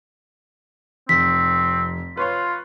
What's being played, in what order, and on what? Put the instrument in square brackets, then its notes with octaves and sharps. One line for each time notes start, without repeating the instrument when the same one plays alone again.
[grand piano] F1 [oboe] C4 [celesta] B6
[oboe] F4 [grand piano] B4 C#5 C6